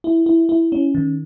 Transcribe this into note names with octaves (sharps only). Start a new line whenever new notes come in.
E4
E4
E4
C#4
D#3